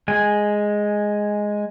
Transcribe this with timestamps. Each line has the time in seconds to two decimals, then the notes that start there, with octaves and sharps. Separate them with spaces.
0.08 G#3 G#5